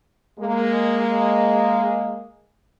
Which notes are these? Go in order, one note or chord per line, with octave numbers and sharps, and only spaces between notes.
G#3 A#3